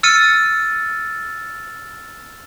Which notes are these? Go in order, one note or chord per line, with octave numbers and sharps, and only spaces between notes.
E6 F6 A6 C#7 D#7